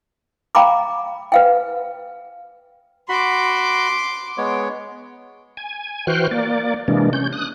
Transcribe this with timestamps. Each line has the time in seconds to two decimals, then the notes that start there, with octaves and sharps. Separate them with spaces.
0.55 F5 G5 A#5 B5 D6
1.32 B4 F5 G5
3.09 F#4 B5 C6 D6
4.38 G#3 B3 C#5
5.57 G#5
6.07 E3 F#4 C5 G5 F6 F#6
6.31 A#3 D5
6.88 C3 E3 G#3 A#3 D4
7.13 C#4 G6
7.33 D#6 F#6